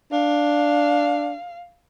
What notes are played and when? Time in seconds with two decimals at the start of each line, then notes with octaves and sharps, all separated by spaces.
0.12 D4 F5